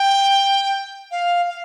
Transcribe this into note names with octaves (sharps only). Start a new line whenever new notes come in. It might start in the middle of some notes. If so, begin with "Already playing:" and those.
Already playing: G5
F5
F5